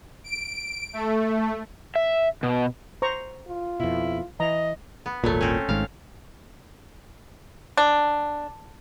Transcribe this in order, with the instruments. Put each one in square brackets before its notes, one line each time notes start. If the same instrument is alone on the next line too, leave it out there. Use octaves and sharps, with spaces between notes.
[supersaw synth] D7
A3
[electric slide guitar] E5
B2
[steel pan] C5 A#5 C#6
[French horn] F4
[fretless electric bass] F2 B2 [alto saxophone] E4
[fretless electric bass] E3 [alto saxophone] D#5 [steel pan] A#5
[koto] B3
[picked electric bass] D#1 G#1 A#2 [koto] F#3 A3
[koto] C4 C#4
[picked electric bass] G#1 G#2 [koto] F5
[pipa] D4